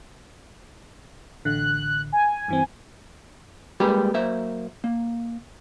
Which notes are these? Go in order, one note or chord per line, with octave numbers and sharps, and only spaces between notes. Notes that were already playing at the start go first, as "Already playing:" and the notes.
A1 D3 F#6
G#5
G2 E3 C4
G3 G#3 A#3 G4 G#4 B4
F#3 A#3 C5 E5
A#3